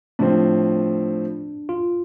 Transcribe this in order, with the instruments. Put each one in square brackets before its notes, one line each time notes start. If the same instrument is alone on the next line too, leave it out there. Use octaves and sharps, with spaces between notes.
[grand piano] A2 F3 C4 [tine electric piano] D4
[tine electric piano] F4